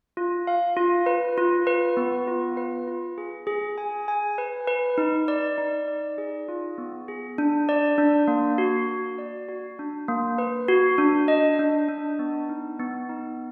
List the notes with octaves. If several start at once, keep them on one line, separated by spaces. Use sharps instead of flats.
F4
F5
F4
B4
F4
B4
B3
F4
B4
F4
G#4
G#4
G#5
G#5
B4
B4
D#4
D5
D#4
D5
G#4
F4
B3
G#4
D4
D5
D4
A#3
F#4
F#4
D5
F#4
D4
A#3
B4
F#4
D4
D#5
D4
D4
B3
D#4
B3
D#4